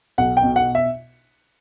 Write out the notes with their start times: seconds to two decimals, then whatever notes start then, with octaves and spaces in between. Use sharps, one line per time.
0.18 B1 F#5
0.37 G5
0.43 B2
0.56 F#5
0.75 E5